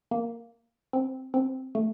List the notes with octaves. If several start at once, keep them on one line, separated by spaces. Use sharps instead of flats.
A#3
C4
C4
A3